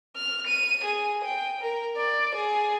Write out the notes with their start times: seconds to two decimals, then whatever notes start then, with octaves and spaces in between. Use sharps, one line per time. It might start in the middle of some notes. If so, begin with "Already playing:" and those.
0.16 F6
0.47 D#7
0.84 G#4
1.24 G5
1.60 A#4
1.97 D5
2.35 G#4